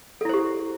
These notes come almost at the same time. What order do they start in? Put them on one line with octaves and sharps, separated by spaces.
A4 E4 C5 G4